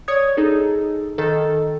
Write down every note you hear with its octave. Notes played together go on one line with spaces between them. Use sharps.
C#5 D5 D#6 G#6
D#4 G#4 A4
D#3 A4